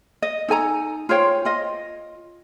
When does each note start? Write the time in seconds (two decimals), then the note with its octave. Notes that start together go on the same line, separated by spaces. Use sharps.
0.22 D#5
0.48 D#4 A4 G#5 A#5
1.09 F4 C5 C#5 G5
1.45 F4 D#5